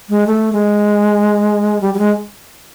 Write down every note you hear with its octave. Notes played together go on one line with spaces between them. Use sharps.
G#3
A3
G#3
G3
G3
G#3